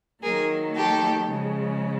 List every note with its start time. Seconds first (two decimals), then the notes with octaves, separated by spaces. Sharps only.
0.22 D#3 F#3 A#3 G#4 A#4
0.76 G4 A4
1.29 C#3 F3 G#3